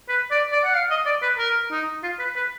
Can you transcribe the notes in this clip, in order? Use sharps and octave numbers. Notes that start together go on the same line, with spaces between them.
B4
D5
D5
F#5
F5
D#5
D5
B4
A#4
D#4
F4
B4
B4